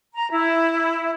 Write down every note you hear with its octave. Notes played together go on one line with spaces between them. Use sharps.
A#5
E4